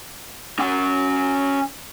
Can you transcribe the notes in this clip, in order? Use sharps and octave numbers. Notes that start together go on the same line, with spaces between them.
C#4 F#5